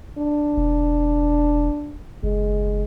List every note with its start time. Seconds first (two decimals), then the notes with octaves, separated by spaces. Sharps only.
0.18 D4
0.57 E1
2.24 F#1 G#3